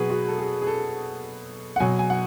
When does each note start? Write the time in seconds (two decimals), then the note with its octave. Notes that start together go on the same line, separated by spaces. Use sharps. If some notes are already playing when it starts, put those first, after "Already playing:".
Already playing: B2 F#3 F#4 G#4 B4
0.10 F#4
0.28 A4
0.38 G#4
0.61 G#4
0.67 A4
1.76 F#5
1.80 B2 F#3 G#5
1.99 G#5
2.10 F#5